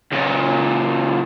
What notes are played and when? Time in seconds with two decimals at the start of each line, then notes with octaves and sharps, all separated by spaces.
0.12 C#2 A#2